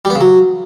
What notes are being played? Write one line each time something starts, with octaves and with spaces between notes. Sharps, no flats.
G3
B3
C#3
F#3